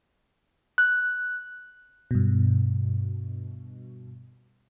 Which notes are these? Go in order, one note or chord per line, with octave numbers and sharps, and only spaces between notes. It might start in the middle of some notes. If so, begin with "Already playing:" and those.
F#6
G2 B2